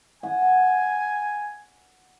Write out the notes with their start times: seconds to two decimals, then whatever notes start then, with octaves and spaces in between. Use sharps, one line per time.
0.23 F#5 G#5